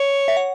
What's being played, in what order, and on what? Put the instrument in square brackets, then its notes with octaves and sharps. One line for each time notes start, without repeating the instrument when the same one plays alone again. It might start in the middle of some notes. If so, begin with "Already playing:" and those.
Already playing: [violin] C#5
[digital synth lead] E5
F#5